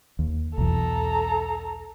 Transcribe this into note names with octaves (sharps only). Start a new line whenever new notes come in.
D#2
B1 E2 A4 A#5